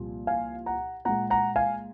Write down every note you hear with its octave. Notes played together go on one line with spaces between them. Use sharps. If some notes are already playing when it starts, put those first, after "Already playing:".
Already playing: C2 A#2 F3
F5 G#5
F#5 A#5
A#2 G#3 F#5 A#5
F#5 A#5
F5 G#5